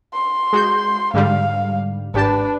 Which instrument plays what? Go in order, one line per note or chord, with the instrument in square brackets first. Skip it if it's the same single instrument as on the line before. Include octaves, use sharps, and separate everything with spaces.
[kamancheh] C6
[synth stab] G#3 F#4 G6
[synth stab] G#2 D3 G3 [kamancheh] F5
[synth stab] G#1 G4 A5 [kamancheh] D4 B4